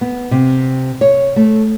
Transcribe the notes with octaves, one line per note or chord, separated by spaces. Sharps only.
B3
C3
C#5
A3